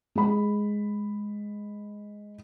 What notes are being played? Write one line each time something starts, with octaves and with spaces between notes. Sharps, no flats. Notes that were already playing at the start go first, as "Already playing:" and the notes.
G#3 B5